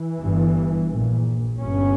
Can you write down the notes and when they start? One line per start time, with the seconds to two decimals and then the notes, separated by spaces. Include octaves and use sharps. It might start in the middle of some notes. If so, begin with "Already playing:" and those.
Already playing: E3
0.21 G1 G2
0.89 A#1 A#2
1.57 G1 G2 C#4